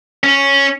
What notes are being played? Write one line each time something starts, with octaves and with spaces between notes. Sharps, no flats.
C#4